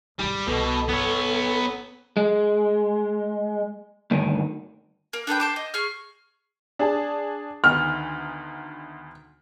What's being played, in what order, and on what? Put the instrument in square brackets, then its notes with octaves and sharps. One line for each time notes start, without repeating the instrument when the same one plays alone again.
[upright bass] G#1 C3 [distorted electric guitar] G3
[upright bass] C2 [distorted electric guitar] B2 [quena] A4
[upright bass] G1 [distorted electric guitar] B3 C#5
[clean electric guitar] G#3
D2 G2 D#3
[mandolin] A#3
D4 A4 B4 G5
C5 A5 D6
D#5
G#4 C#6 F6
[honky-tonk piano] D4 G#4 A5
[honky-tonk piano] D2 D#3 B3 [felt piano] F6